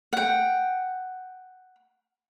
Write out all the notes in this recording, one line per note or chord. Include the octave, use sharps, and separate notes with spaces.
F#5 G5